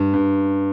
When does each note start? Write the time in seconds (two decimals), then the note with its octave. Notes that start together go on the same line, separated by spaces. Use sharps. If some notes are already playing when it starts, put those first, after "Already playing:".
Already playing: G2
0.13 G2